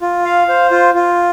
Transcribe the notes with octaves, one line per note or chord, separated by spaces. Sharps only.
F4
F5
C5
F4
F4